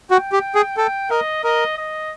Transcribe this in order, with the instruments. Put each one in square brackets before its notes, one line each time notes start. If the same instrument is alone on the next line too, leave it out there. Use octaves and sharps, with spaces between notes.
[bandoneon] F#4 [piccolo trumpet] G5
[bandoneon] G4
G#4
[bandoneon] A4 [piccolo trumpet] G5
[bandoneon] A#4 [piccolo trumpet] D#5
[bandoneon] A#4 [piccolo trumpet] D#5
[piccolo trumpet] D#5